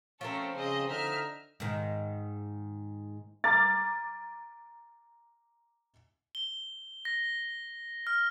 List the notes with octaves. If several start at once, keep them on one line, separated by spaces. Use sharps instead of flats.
F3 A3 C4 C#4 A4 A#4
C#3 G#4 C5 D#5
D3 D#4 E5 F6
G#2 D#3
A#5 D6 F6 A6
G7
A#6
F6